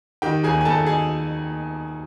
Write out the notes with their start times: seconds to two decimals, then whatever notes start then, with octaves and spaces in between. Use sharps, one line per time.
0.22 D#3 G4 G5
0.43 D#2 G#4 G#5
0.61 G#5
0.65 D#2 A4 A5
0.86 G#4 G#5